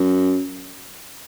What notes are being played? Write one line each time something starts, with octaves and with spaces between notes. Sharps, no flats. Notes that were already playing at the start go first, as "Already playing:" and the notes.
Already playing: F#2